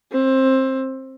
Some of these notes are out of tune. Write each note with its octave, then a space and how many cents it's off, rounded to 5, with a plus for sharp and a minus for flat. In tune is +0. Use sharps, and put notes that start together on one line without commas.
C4 +20